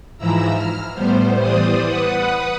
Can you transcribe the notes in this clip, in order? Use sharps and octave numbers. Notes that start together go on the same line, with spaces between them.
G#2 E3 F3 E4 A#5 E6
F6
A2 G3 B3 C5
E3 G3 C5 D5 D#6
B4 F#5 D#6